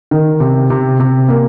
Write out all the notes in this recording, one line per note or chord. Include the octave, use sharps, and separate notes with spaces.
D#3
C3
C3
C3
A#3